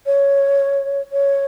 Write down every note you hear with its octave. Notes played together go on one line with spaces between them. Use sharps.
C#5
C#5